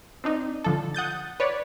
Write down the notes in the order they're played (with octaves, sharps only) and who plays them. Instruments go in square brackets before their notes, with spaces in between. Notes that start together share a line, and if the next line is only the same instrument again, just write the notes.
[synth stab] C4 D4 D#4
D3 F3 A4
F#5 D#6 G6 A6
B4 C#5 D5